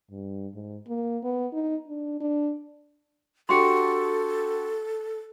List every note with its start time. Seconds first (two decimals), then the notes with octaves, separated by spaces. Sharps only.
0.11 G2
0.54 G#2
0.88 A#3
1.23 B3
1.53 D#4
1.87 D4
2.20 D4
3.49 D4 F#4 G4 A4 C6 C#6 C#7